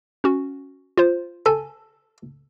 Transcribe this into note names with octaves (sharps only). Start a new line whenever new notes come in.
C#4 F#4
F4 C5
A4 G#5